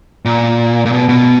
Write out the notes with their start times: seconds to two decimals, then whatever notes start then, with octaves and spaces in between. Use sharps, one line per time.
0.25 A#2
0.86 A#2
0.92 B2
1.09 B2